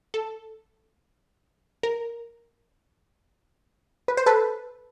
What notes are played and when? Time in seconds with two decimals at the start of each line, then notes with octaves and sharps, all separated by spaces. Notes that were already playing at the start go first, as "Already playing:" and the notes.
0.14 A4
1.83 A#4
4.08 B4
4.17 C5
4.26 A4 B4